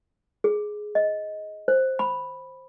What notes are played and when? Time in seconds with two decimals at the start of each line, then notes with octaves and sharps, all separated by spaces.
0.44 G#4
0.95 D#5
1.68 C5
1.99 B5